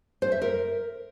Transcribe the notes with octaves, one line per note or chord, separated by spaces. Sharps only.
C5
E5
A#4